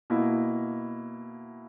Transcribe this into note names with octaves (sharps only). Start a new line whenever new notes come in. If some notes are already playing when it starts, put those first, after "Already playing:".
B2 A#3 E4